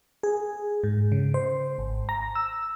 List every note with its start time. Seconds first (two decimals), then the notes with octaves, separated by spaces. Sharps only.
0.23 G#4
0.84 G#2
1.12 C#3
1.34 C5
1.78 G#1
2.09 A#5
2.35 E6